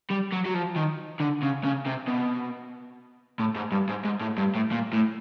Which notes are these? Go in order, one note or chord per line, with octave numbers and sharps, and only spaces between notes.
G3
F#3
F#3
F3
D#3
D3
C#3
C#3
C3
B2
A2
G#2
G2
G#2
G#2
A2
G2
A2
A#2
A2